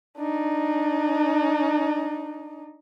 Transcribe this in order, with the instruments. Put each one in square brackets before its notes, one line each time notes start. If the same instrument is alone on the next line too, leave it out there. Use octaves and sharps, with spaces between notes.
[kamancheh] D4 D#4